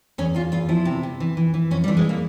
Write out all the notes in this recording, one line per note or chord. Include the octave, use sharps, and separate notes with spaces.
E2 C#4
E2 F4
E2 F4
F3 E4
C3
C3
E3
E3
E3
F2 C#4
G3
E3
G#3
A#3